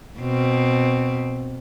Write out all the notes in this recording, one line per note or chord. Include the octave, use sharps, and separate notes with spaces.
B2 C4